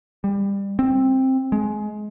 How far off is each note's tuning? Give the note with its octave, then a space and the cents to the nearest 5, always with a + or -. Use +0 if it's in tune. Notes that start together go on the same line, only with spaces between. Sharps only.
G3 +20
C4 +10
G#3 +25